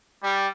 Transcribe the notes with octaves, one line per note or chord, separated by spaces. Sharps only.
G3